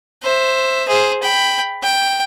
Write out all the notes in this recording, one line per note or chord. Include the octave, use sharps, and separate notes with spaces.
C5 E5
G#4 C5
G5 B5
G5